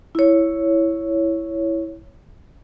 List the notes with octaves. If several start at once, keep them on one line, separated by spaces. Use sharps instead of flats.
E4 C#5